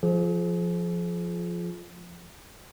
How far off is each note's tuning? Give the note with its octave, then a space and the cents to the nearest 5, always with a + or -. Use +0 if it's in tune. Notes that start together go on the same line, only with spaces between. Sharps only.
F3 +0 F4 +0 G#4 +40